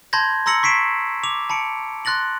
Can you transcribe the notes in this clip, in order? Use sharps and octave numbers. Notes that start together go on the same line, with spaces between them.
A5 B5 C6 G6 G#6 A#6
A#5 C6 E6 A#6 C#7 F#7
C#6 B6 C7 D7 E7
D6 F7
A5 B5 C#7 D7
C6 F#6 A6 A#6 F#7